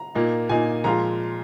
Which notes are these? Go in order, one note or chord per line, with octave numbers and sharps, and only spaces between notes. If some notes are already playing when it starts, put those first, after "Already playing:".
Already playing: A#5
A#2 A#3 D#4
A#2 A#3 D#4 G#5
A#2 F3 G#3 F4 A#5